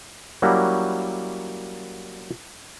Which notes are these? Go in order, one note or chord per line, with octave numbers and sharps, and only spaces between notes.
F#3 G3 A#3 C#4 E4 F#4